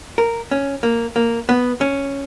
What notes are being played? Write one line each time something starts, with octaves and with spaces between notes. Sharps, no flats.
A#4
C#4
A#3
A#3
B3
C#4